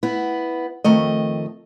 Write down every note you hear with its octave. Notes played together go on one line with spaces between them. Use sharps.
B3 E4
F2 D#3 A3 D#5